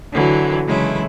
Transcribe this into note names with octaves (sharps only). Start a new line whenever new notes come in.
D3 E3 F#3
C#3 E3 F#3 G#3 A3 E4